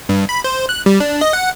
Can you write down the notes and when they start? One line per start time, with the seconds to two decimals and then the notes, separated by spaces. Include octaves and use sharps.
0.09 G2
0.29 B5
0.44 C5
0.69 F#6
0.86 G3
1.00 D4
1.21 D#5
1.33 F#5